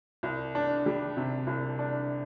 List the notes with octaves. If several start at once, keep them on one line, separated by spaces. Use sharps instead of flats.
C2
D4
G3
C3
C2
D4